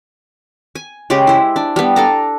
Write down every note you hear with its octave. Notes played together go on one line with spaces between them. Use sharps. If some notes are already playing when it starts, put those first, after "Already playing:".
G#5
C#3 G#3 G4 G#4
E4 C5
D4
G3 B3
D4 A4 A#5